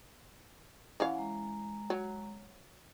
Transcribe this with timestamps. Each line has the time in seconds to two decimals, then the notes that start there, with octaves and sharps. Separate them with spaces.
1.00 E3 C#4 F5 F#5
1.18 G#3 A#5
1.90 F#3